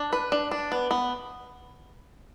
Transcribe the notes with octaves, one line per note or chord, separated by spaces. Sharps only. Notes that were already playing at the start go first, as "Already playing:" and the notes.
Already playing: D4
B4
D4
D4
B3
B3